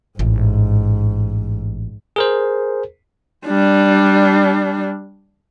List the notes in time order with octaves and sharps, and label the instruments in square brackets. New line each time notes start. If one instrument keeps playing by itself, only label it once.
[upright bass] A1 [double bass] G#2
[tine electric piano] G#4 A#4 C5
[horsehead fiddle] G3 D4